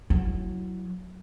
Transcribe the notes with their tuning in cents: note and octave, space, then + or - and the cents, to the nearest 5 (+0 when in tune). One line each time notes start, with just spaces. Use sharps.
F#3 +0 E4 +0